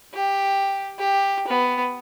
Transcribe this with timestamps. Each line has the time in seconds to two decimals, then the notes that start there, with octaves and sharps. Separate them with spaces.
0.14 G4
0.99 G4
1.48 B3